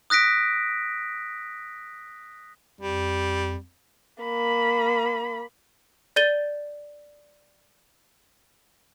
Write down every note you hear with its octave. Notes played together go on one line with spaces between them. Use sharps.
D#6 F#6 A#6 B6 D7
F2 G3
A#3 B5
D5 G6 A6 D#7 G7